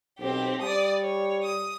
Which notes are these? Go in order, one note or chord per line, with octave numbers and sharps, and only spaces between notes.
B1 C4 G4
G3 D5 D#6
C#5
D#6